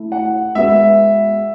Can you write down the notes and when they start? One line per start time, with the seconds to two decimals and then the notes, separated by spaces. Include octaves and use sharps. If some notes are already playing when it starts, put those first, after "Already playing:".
Already playing: A3 E4
0.12 F#5
0.55 G#3 B3 F#4 B4 E5